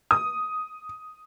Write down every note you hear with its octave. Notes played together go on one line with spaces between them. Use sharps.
D#6